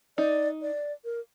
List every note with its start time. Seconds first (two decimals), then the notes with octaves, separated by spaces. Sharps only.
0.18 D#4 D5
0.62 D5
1.05 A#4